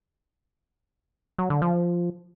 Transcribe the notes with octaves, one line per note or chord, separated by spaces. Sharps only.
F#3
D3
F3